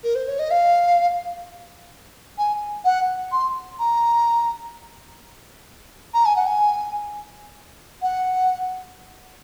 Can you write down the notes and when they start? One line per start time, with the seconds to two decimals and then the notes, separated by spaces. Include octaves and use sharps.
0.04 A#4
0.15 C5
0.28 C#5
0.39 D#5
0.51 F5
2.38 G#5
2.85 F#5
3.32 C6
3.79 A#5
6.14 A#5
6.25 G#5
6.36 F#5
6.47 G#5
8.02 F#5